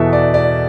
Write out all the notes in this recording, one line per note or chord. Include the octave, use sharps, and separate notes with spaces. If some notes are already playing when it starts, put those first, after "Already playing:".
Already playing: E2 B2 B3 A4 E5
D5
D5